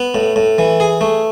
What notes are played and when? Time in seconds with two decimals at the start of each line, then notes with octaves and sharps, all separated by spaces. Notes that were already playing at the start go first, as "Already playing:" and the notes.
Already playing: B3
0.15 A2
0.36 A2
0.58 E3
0.80 G#4
1.01 A3